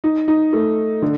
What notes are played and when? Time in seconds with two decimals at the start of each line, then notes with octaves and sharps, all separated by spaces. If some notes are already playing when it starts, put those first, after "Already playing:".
0.04 D#4
0.28 D#4
0.53 A3
1.02 D3